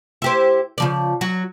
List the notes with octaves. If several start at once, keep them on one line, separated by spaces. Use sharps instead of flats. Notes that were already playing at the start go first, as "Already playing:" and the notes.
E4 G4 C5
C#3 F3 D5
F#3 F#4